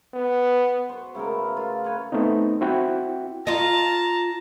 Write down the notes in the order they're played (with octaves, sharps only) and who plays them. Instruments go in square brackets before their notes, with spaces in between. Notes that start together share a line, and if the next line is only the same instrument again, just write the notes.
[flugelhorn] B3
[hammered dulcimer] F#4 C5
C#3 A3 B3 A#4
A3
F4
B4 C#5
[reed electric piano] A3 B3 C4 D#4
C4 E4 F#4 G5
[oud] F4 D#5 [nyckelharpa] A5 A#5